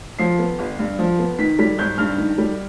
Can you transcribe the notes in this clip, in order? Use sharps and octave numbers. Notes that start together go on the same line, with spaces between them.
F3 C7
B3
G1
G2
F3
B3
D#3 B6
G3 B6
G#1 G6
G2 F6
D#3
G3